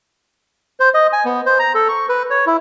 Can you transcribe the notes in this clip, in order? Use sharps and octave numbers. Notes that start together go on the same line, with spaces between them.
C5
D#5
G#5
B3
C5
A#5
A4
C#6
B4
C#5
E4